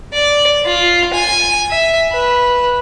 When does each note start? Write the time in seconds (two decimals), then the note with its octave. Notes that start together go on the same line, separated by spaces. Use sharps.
0.13 D5
0.66 F4
1.14 G#5
1.70 E5
2.12 B4